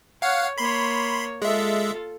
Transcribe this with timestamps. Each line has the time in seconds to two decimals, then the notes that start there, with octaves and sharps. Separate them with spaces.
0.22 C#5 F5 F#5
0.58 A#3 C#5 B5 C6
1.42 G#3 F4 A4 E5